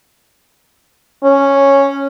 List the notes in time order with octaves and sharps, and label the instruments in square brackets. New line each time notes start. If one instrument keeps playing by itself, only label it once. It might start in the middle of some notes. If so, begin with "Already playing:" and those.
[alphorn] C#4